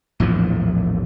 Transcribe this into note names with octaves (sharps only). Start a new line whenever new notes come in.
A#1 E2 A2 F3